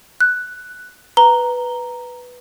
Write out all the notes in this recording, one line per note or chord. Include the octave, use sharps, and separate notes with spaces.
F#6
B4 A#5 G7